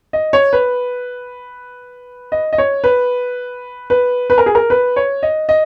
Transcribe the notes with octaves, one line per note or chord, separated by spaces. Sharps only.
D#5
C#5
B4
D#5
D#5
C#5
B4
B4
B4
A#4
G#4
A#4
B4
C#5
D#5
D#5